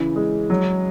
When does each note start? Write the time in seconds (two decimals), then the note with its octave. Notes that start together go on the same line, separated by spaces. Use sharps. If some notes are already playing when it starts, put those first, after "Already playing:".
Already playing: C#3 E3
0.16 G#3
0.50 F#3